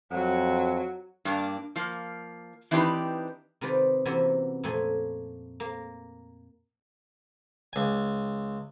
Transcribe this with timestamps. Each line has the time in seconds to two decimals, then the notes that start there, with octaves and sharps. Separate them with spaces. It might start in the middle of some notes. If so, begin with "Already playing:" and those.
0.12 F2 F#3
1.25 G2 A#3 D4
1.76 F3 A#3
2.71 E3 C4 D4 D#4 G4 B4
3.61 C3 D#3 F4 B4 C5 D5
4.05 C3 E3 A#3 B3 C#4 F#4
4.64 F2 A#2 A3 G#5 C6
5.60 A#3
7.73 C#2 G#5